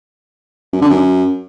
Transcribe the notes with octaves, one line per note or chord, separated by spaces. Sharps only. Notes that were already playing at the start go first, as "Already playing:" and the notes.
F#2
D3
F#2